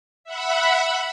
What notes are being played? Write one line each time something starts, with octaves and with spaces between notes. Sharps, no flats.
E5 F#5 B5